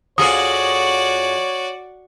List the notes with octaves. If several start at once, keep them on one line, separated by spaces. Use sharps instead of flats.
F2 F#4 G#4 C#5 D5 D#6